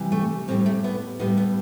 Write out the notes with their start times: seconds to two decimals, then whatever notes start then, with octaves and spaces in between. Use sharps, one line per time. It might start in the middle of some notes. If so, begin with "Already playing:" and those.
Already playing: C3 E3 G3
0.12 A3
0.48 A2 G3 C4
0.66 A3
0.84 B3
1.19 A2 G3 B3
1.37 B3